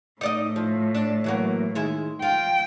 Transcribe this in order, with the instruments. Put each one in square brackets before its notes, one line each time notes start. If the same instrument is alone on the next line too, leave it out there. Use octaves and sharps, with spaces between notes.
[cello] A2 [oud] D#4 D5 D#5
[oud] F3
D4
E3 F#3 A#3
D#3 G#3 E4
[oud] F4 [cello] G5